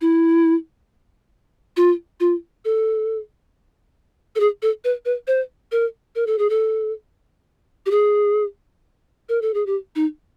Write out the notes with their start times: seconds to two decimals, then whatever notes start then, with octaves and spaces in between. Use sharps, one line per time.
0.01 E4
1.77 F4
2.20 F4
2.65 A4
4.36 A4
4.40 G#4
4.62 A4
4.84 B4
5.05 B4
5.27 C5
5.72 A#4
6.15 A#4
6.27 A4
6.39 G#4
6.50 A4
7.86 G4
7.91 G#4
9.29 A#4
9.42 A4
9.54 G#4
9.66 G4
9.95 D#4